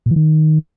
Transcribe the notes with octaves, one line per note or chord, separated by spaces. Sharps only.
A#2
E3
D#3